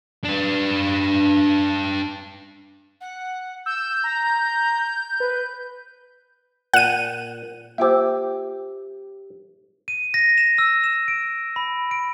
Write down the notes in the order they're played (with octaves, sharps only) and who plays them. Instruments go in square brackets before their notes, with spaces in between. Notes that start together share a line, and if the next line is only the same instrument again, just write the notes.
[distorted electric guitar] D4 B4
[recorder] F#5
[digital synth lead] E6 [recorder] G6
[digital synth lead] A#5
B4
[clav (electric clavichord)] A#2 [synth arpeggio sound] F#5 D#7
[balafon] A#3 F4 C5 [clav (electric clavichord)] G4 E5
[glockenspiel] D#7
A#6
E7
E6
E7
D7
B5
D7